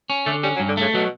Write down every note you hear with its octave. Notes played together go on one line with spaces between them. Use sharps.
C#4
D3 A3
G3 C#4
F#3
G2
D3
C#3 A3
B2 F#3